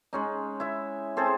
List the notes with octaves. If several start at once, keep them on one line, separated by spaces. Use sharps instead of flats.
G#3 C#4 D#4
E4 E5
C4 G#4 A4 C5